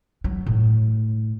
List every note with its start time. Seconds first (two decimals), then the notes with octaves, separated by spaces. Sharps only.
0.24 F#3
0.46 A2